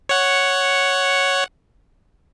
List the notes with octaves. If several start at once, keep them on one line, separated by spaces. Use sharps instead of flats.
C#5 F#5